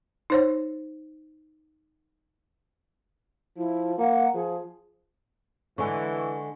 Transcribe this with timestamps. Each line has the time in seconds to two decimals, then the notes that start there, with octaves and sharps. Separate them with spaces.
0.30 D#4 C5 C#5
3.57 F3 E4
3.98 A#3 F#5
4.34 F3 G#4
5.78 D3 E3 G#3 G#5 C#6